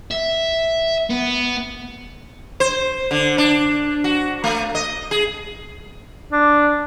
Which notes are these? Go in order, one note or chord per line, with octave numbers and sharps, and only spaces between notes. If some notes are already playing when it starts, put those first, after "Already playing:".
E5
B3
C5
D3
D4
F#4
A3
D#5
G#4
D4